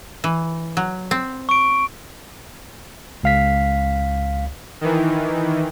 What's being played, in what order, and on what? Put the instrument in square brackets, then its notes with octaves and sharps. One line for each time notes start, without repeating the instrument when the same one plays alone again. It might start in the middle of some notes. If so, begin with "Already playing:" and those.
[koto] E3
F#3
C4
[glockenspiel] C#6 D7
[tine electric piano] C#2 F5 B6
[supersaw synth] D#3 E3